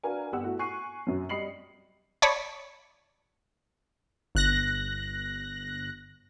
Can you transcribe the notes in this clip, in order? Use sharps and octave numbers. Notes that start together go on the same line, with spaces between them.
D4 F#4 A#4 B4 F5 G#5
G1 G4 F#5 E6
A3 E4 F#4
G#5 C#6 F#6 C7 D#7
F#2 F#3
G3 D#5 B5 C7 C#7 F#7
C#5 D5 A5 B5 C#6 D#6
G1 F#6 A#6